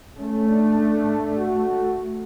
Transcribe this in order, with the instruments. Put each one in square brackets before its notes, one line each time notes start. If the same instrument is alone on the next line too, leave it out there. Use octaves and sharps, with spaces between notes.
[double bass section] A3 [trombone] C#4
[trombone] D4
F#4